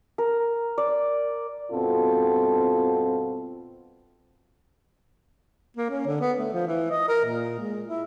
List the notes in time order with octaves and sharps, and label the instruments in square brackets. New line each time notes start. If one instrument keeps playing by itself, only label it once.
[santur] A#4
D5
[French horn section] G2 B2 C4 F4 A4
[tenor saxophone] A#3
C#4
D3
B3
A3
F3
E3
D#5
A#4
A#2
G#3
E4